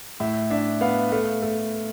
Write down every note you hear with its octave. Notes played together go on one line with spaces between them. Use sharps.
A2 E5
D4 E5
B3 F5
A3 F5
A3